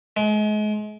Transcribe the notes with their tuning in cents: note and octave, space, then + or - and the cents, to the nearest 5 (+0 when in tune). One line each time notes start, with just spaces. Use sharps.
G#3 +35